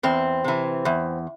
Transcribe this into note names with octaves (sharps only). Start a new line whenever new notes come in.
E2 C4
C3 E3
E2